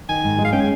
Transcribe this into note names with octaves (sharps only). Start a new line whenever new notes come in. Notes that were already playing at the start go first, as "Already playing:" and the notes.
D#3 G#5
G#2
G#3
F5
C#4 G5
G#5